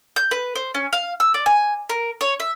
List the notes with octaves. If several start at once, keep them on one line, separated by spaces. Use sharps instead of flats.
G6
B4
C5
C#4
F5
E6
D5
G#5
A#4
C#5
E5